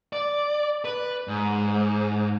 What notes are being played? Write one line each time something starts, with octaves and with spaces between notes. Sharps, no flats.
D5
B4
G#2